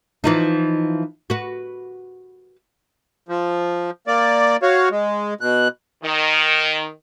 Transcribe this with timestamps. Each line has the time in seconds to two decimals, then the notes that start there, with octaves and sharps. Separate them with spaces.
0.24 E3 F3 D#4
1.30 F#4 B4
3.29 F3
4.08 A#3 D5
4.63 F#4 C#5 F5
4.91 G#3
5.41 B2 F#6
6.04 D#3